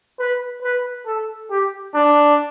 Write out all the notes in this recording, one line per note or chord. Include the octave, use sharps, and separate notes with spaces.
B4
B4
A4
G4
D4